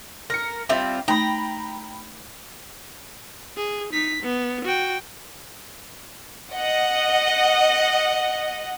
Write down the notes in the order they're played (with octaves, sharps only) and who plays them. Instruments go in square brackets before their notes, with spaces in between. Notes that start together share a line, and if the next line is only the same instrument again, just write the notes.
[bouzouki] A#4 [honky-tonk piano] A#6 C#7
[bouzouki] G3 C4 F4 [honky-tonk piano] E5
[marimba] A3 D#4 [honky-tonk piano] G5 B5 [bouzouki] A#5
[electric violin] G#4
D#4 B6
B3
F#4 G5
[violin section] D#5 F#5